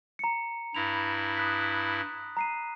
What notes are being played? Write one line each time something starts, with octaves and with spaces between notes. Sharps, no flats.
A#5 C#7
G2 E4 B5 A#6 F7
D#6 F#6 B6
A#5 C7 D#7